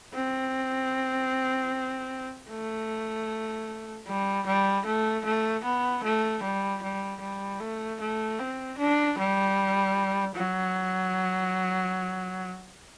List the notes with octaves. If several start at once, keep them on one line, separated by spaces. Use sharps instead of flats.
C4
A3
G3
G3
A3
A3
B3
A3
G3
G3
G3
A3
A3
C4
D4
G3
F#3